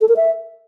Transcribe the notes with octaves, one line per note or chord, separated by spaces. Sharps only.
A4
A#4
E5